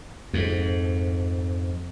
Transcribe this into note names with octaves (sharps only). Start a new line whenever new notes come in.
F2 G#2